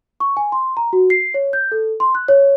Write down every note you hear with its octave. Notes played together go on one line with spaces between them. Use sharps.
C#6
G#5
C6
A#5
F#4
C7
C#5
G6
A4
C6
F#6
C#5